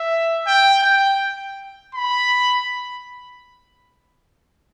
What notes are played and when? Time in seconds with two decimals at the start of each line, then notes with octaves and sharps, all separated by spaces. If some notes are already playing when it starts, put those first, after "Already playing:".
Already playing: E5
0.47 G5
0.83 G5
1.95 B5